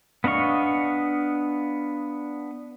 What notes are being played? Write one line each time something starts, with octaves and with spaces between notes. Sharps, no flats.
B3 D4 D#5 F5 C#6